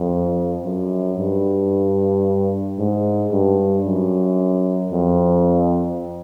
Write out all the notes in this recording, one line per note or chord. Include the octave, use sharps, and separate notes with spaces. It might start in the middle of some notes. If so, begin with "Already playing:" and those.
Already playing: F2
F#2
G2
G#2
G2
F#2
F2